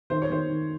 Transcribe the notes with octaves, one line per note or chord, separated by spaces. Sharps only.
D#3 C5
C#5
D#3 C5
D#3